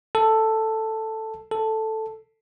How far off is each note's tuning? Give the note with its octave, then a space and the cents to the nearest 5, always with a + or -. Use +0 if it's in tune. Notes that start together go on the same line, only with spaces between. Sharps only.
A4 +5
A4 +0